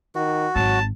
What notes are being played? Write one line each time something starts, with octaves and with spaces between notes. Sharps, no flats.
D#3 F#4
G#1 F#3 A5